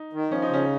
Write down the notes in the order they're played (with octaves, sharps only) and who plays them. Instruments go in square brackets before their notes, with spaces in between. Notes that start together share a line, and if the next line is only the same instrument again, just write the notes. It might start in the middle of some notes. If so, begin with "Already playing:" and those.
Already playing: [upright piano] D#4
[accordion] D#3
[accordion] F3 [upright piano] C#4
[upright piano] D#4
[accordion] C#3 [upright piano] C#4